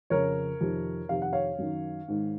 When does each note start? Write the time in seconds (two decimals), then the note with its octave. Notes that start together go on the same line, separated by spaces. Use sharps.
0.10 F2 C#3 A#4 C#5
0.61 F2 C3 D#3
1.09 F2 C3 D#3 F5
1.22 F#5
1.33 C#5 F5
1.59 F#2 D#3
2.08 G#2 D#3